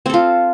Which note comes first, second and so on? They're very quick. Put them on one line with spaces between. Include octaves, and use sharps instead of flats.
C4 A4 F4